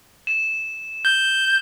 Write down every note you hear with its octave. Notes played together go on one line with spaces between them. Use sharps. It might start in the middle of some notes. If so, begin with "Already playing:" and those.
E7
G6